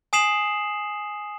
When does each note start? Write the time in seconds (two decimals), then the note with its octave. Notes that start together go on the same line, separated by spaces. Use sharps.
0.13 G#5 D#6 C7 E7 F#7